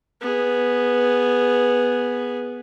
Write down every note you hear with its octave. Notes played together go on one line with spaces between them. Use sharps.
B3 G#4